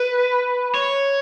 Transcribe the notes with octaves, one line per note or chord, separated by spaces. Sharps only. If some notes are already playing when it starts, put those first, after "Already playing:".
Already playing: B4
C#5